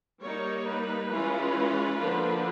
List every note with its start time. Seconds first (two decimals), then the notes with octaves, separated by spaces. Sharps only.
0.22 G3 A#3 D#4 C#5
0.66 B4
1.11 E3 G#3 C#4 F4
1.99 D3 F3 A#3 D4 F4